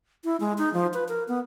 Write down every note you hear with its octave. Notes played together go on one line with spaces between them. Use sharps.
E4
G#3
D#4
F3
B4
A#4
B3